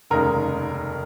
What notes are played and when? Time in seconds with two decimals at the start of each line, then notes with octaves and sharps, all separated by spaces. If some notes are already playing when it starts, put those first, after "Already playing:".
0.10 F1 D#2 C#3 G#3 A#4